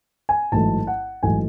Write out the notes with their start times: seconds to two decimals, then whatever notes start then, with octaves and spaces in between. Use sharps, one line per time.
0.29 G#5
0.52 A1 G#2 F#3 A3 A5
0.87 F#5
1.23 A1 G#2 F#3 A3 G#5